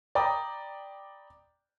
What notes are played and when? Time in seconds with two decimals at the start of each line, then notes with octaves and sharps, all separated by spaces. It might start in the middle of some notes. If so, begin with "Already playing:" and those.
0.15 D5 G5 A#5 B5 D6 D#6